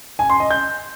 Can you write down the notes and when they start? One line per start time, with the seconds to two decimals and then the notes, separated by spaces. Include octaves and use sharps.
0.19 G#5
0.30 C6
0.40 D#5
0.51 G6